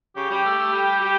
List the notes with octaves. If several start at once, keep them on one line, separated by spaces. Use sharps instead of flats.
C#3 G4
G3 G4
A3
A3
G3
G4